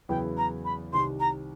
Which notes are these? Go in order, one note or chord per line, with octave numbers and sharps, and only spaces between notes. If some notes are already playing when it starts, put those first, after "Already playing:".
E2 C#3 F#3 B3 E4 G5
A#5
B5
C2 C3 D#3 C6
A#5